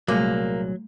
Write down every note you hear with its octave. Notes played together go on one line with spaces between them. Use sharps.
C2 A#2 F#3 G3 A3 A#3 G#4 D6